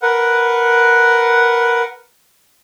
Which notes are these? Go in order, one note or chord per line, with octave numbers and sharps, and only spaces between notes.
A#4 B4 F#5